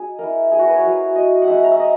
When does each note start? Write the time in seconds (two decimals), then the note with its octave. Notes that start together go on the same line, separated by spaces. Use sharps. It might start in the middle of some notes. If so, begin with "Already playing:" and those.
Already playing: F#3 D#4 G#4
0.19 A#3 E4 A#4
0.51 G#4
0.59 F#4
0.67 B4
0.75 C#5
0.83 F#3 A#3 E4
1.15 D#5
1.42 F#5
1.48 G#3 D#4 E5
1.56 B5
1.64 A#5
1.72 E5
1.80 D#5